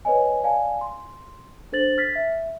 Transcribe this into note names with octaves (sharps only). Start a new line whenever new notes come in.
B4 C#5 D#5 G#5
D5 F5 G#5 A5
C6
D4 A4 C5 A6 F#7
F6 A6 B6
E5